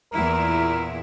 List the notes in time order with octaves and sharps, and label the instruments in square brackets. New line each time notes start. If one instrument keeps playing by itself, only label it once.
[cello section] E2 A#2 E4 [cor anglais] A#4